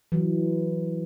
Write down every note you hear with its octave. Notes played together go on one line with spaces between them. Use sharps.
E3 F#3